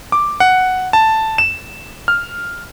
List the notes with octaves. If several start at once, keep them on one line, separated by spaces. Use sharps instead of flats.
D6
F#5
A5
E7
F6